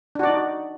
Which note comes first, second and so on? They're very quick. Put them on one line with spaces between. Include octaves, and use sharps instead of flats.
D4 F#4 D5 D#4